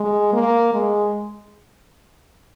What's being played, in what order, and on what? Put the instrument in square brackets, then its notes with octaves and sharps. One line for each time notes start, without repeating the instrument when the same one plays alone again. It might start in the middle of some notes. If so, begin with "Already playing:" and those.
Already playing: [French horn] G#3
A#3
G#3